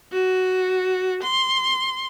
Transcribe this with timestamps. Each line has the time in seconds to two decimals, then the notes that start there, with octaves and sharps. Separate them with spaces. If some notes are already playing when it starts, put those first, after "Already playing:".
0.12 F#4
1.23 C6